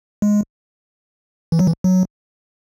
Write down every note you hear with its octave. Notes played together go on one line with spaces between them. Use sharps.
G#3
E3
F#3
E3
F#3